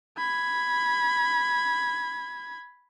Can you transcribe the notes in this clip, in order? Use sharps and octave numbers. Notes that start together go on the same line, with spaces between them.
B5 G#6